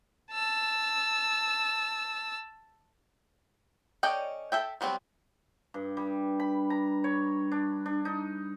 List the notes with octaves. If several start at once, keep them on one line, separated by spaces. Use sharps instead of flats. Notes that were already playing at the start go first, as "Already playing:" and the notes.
A5 E6
C#4 A4 D5 D#5 G5
A4 E5 G5
F#3 G3 B3 C4
G2
G3
B5
A#5
C#5
D4
D4
D#4